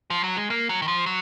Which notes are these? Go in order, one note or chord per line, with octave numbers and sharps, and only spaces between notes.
F3
F#3
G#3
A#3
F#3
D#3
F3
F#3